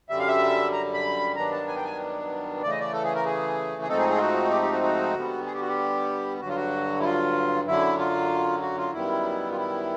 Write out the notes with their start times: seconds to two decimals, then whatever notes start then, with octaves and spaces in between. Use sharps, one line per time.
0.09 F#2 D3 G3 E5
0.19 F5
0.28 E5
0.73 A#5
0.94 B5
1.36 G2 D#3 F#3 B3 D4 A#5
1.51 A5
1.67 G#5
1.76 G5
1.84 G#5
2.62 C#3 E3 A3 D5
2.71 D#5
2.79 D5
2.93 A4
3.04 G#4
3.15 A#4
3.25 G#4
3.82 G#4
3.88 G#2 F3 A3 C4 D#4 A4
3.99 G#4
4.09 G#4
4.16 F4
4.20 F#4
4.51 G4
4.62 G4
4.72 F#4
4.83 F#4
5.14 D3 G3 B3
5.46 G#4
5.53 G4
5.61 F#4
5.68 G4
6.41 G2 D3 F#3 F#4
6.49 F4
6.56 F#4
7.00 E4
7.04 F4
7.67 F#2 D3 F#3 E4
7.99 F4
8.62 F#4
8.77 F4
8.93 F#2 D#3 G3 B3 E4
9.52 F4
9.56 E4